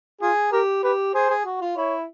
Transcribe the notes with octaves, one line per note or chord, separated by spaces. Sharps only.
F4 G#4
G4 A#4
G4 B4
G#4 C5
G#4
F#4
F4
E4 C#5